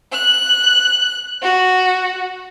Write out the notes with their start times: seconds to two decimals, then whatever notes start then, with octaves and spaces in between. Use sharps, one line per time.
0.12 F#6
1.42 F#4